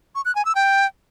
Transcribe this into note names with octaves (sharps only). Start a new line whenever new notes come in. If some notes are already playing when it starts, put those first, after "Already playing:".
C#6
F#6
G#5
E6
G5